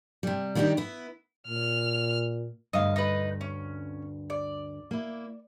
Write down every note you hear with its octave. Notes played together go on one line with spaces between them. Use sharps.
C3 G3
D#3 G3 D4 D#4 G4
B3 E4
A#2 F6
D2 G2 D#5 F5
D#4 B4
C#4
D5
A#3 E4